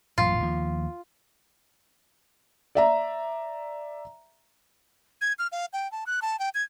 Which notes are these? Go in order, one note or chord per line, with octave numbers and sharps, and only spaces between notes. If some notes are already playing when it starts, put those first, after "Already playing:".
A1 F#2 A#2 F4
D#2 F3
D5 E5 A#5
G#6
F6
F5
G5
A5
F#6
A5
G5
G#6